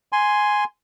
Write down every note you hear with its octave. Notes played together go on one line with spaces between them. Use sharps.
G#5 C6